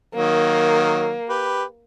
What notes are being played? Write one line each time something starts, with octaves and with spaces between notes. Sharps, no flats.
D#3 F#3 A#3
G4 B4